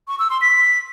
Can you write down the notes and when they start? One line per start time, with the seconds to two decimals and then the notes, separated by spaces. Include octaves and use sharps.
0.07 C#6
0.19 E6
0.30 C6
0.41 B6